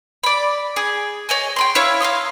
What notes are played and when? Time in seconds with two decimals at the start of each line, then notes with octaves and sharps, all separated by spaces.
0.24 D5 B5
0.76 G#4
1.29 C#5 D#5 G#5
1.56 G5 B5 C6
1.75 E4 C#5 F5
2.00 F5 A#5 C6 D#6